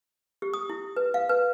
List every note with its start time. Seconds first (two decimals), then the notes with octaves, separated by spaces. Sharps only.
0.42 G4
0.54 D#6
0.69 E4
0.96 B4
1.14 F5
1.29 B4